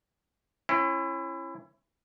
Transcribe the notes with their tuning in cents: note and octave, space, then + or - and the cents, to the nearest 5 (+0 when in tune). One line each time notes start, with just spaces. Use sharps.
C#4 -30 E4 +25